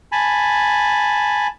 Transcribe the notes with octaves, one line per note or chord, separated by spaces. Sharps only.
G#5 A5 B5